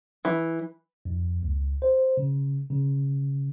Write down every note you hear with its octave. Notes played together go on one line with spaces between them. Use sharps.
E3
F2
C#2
C5
C#3
C#3